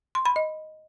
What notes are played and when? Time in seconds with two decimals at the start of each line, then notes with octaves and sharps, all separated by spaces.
0.15 C6
0.26 B5
0.36 D#5